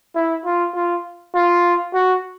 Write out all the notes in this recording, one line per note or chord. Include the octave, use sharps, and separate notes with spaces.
E4
F4
F4
F4
F#4